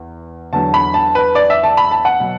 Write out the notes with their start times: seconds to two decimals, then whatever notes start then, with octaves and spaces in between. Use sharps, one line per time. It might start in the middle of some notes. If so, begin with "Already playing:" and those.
Already playing: E2
0.53 E2 D3 F#3 A5
0.74 B5
0.94 A5
1.15 B4
1.35 D5
1.50 E5
1.64 A5
1.77 B5
1.91 A5
2.05 F#5
2.20 B2 F#3